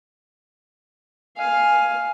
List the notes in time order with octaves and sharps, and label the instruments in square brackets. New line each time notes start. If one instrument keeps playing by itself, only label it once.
[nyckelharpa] F5 [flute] G#5